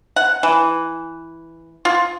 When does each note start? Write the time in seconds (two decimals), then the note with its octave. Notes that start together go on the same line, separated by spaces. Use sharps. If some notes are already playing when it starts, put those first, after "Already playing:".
0.16 F#5
0.43 E3
1.85 F4